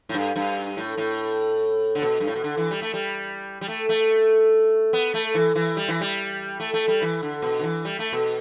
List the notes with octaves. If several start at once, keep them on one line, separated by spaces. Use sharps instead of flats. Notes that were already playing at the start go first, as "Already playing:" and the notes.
A2
G2
G2
A2
A2
D3
B2
G2
A2
B2
D3
E3
G3
A3
G3
G3
A3
A3
B3
A3
E3
E3
G3
E3
G3
A3
A3
G3
E3
D3
B2
D3
E3
G3
A3
B2